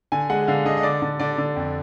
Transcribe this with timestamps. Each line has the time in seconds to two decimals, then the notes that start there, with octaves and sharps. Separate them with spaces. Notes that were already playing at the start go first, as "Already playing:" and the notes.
0.12 D3 G#5
0.30 G#3 F#5
0.48 D3 F5
0.65 D3 D#5
0.77 D#5
0.83 D3 D5
1.02 D3
1.20 D3 D5
1.38 D3
1.56 F2